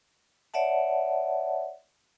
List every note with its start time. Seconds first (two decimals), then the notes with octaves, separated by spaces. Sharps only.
0.54 C#5 D5 E5 F#5 A5